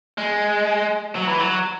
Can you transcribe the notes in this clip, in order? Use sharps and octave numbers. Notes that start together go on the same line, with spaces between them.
G#3
F#3
E3
F#3